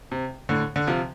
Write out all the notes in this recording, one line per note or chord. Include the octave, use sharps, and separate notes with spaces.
C3
A2 D3
D3
C3 F3